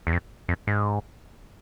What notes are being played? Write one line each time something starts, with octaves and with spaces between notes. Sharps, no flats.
E2
F2
F2
G#2